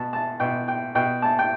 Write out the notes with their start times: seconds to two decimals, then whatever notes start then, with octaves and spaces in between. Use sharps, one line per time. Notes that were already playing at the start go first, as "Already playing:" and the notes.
Already playing: B2 A5
0.13 A5
0.40 B2 G5
0.68 G5
0.95 B2 G5
1.22 A5
1.39 G5